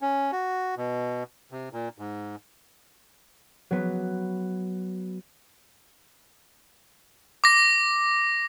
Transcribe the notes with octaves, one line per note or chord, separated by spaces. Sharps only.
C#4
F#4
B2
C3
A#2
G#2
F#3 B3
D6 A#6